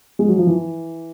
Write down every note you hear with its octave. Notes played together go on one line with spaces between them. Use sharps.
G#3
F#3
F3
E3